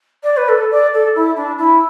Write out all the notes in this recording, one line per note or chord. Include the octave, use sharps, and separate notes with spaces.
D5
B4
A4
D5
A4
E4
D4
E4